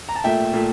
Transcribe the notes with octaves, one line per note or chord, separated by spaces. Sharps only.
A#5
A5
A#2 A3 E5 G5
A#2 A3